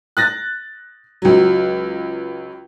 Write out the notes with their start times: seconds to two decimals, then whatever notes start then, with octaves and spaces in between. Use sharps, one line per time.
0.17 F#6 A6 A#6
1.22 C#2 F#3